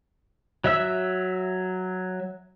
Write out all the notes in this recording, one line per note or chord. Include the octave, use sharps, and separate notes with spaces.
F#3 E5 E6